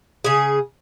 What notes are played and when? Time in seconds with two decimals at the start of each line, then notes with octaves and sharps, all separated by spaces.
0.24 C#3 G#4